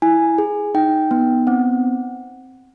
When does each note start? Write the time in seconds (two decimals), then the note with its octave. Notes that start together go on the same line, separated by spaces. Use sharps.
0.02 E4 G#5
0.38 G#4
0.74 D#4 G5
1.11 B3
1.47 C4 F#5